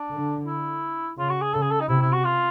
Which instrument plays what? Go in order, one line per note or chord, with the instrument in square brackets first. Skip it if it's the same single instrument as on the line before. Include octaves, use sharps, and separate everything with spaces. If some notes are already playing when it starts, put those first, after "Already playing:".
Already playing: [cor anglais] D4
[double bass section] D3
[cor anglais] E4
[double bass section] C#3 [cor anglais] F4
[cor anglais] F#4
G#4
[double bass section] C#3 [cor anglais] A4
[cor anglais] G#4
A4
D#4
[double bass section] C3 [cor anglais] E4
[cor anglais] E4
F#4
F4